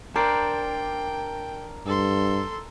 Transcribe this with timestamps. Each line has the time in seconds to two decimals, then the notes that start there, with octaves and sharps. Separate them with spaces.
0.16 D4 A#4 C5 D5 G5
1.86 G2 A4 C6